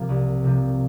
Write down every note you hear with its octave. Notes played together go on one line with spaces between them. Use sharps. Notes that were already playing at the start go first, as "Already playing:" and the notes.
Already playing: C3 F3 A#3
C2
C3 F3 A#3